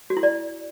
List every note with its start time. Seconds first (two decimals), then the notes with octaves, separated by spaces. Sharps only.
0.10 F#4
0.17 E4
0.23 D5